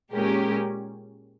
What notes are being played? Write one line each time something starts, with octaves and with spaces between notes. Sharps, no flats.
A#2 G#3 C#4 G4 A#4